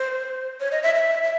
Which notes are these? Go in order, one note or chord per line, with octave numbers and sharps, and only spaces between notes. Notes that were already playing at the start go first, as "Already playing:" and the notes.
Already playing: C5
C#5
D#5
E5
E5
E5